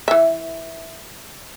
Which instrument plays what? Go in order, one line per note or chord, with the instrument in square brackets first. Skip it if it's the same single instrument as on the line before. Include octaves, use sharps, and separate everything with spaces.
[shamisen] E3 E5